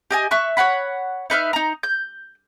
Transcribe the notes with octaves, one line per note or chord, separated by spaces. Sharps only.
G4 D#5 G#5
E5 C#6 F#6
C#5 D5 F#5 B5
D#4 B4 E5 F6
D#4 A#5
G6